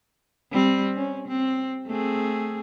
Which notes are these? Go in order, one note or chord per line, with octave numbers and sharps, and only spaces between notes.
G3 C4
C#4
C4
A3 C4 G#4